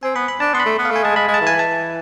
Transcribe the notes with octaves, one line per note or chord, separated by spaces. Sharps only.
C4 G#5
B3 B5
B5
D4 A5
B3 C6
B5
A3
B3
F5
A3
G#5
G#3 A5
G#3 B5
G#3
A5
E3
G#5
A5